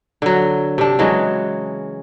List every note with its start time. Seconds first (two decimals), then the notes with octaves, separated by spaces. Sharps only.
0.22 D3 F#3
0.78 C3 D4
0.99 C#3 E3 F#3 G#3